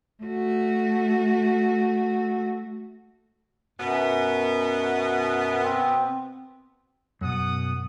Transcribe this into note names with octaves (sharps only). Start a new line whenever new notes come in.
A3 F#4
F#2 B2 B3
C4
F#2 B2 F#5 D#6